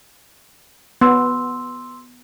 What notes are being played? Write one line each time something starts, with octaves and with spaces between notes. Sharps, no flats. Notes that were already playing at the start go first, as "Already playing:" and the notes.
B3 C6 E6